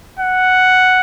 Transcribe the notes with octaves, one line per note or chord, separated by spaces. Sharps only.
F#5